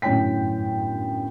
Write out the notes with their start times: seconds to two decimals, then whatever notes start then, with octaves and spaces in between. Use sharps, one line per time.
0.02 G1 F#2 A2 C#5 G5 B6